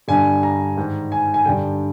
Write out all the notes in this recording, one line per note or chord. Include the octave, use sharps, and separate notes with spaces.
G2 D3 G#5
A#5
G#2 D#3
G#5
G#5
G2 D3 G5